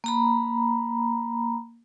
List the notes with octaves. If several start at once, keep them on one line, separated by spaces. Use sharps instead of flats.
A#3 A#5 B5